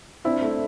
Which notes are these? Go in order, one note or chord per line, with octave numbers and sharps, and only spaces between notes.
C4 D4 E4
A3